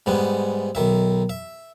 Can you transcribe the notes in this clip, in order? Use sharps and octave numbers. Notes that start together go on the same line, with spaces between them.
G#2 G3 G#3 B3
B1 D#3 E5
E5